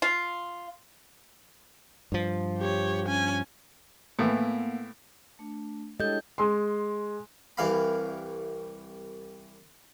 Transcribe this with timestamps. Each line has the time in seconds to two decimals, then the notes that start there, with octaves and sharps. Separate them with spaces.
0.02 F4
2.12 G2 F3
2.58 G4 C#5
3.07 C#4 G#5
4.19 A2 E3 A#3 B3
5.39 A3 D4
6.00 G#3 D4 E4 G4 A4 C#5 D#5 G6
6.38 G#3 C6
7.57 C2 E3 F5 B5